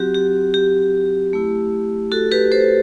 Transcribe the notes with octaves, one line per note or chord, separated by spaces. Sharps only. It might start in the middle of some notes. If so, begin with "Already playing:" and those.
Already playing: F#3 C4 F#4 G4
G4
G4
A3 E4
F#4 A4
G4 B4
A4 C5